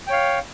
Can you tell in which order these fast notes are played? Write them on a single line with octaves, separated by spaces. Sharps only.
G5 C#5 F5